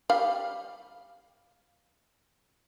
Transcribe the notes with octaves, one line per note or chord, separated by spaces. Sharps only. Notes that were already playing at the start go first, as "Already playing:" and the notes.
G3 F5